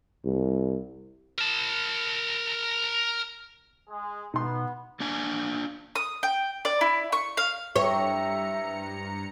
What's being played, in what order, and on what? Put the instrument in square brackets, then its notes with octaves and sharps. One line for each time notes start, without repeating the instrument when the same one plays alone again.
[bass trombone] C2
[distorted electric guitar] A#4 A5
[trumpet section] G#3 G#4
[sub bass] B2 [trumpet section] B3 [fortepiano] D#4 C6
[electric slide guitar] A#3 D4 F5 G#5
[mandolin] D#6
G5
D5
E4
C#6
F5
[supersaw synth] G2 A#5 C#7 [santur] E4 G4 C5 [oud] C#5 [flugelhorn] E5